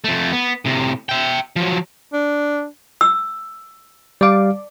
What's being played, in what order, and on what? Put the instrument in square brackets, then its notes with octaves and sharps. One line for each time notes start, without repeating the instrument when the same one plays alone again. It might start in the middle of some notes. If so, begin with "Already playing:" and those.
[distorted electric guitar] F2 A3
B3
A2 C3
E5 G5
F3 F#3
[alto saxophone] D4
[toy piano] E6
[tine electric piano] G3 F5 [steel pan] D5 D6